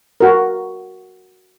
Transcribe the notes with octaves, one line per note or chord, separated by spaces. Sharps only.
F#4 A#4